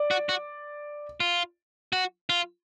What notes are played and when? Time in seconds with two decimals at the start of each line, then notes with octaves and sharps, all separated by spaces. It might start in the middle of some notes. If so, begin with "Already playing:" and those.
Already playing: D5
0.11 F#4
0.29 F#4
1.20 F4
1.93 F#4
2.30 F4